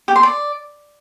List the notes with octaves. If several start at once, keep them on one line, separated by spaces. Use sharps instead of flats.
G4
C6
D5